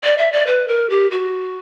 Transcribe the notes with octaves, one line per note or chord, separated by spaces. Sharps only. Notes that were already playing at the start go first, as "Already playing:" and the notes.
D5
E5
D5
B4
A#4
G4
F#4